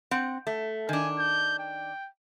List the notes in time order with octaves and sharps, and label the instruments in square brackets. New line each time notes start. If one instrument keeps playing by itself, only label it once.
[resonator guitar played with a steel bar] C4 F#5
A3
[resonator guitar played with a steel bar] D#3 D4 [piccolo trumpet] G#5
[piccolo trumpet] G6
G5